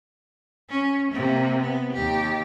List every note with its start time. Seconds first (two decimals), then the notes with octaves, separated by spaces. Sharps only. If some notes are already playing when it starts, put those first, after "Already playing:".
0.69 C#4
1.12 C3 A#3
1.61 B3
1.93 D#2 G4